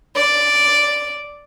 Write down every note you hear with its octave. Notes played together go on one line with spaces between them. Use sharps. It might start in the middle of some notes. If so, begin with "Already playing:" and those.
D5